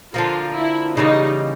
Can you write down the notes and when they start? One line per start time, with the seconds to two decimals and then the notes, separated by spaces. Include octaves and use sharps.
0.14 D3 F3 A#3 F4
0.56 E4
0.97 C#3 E3 G3 A#3 D#4